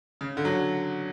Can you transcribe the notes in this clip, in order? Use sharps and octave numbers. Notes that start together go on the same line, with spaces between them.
C#3
D3
F#3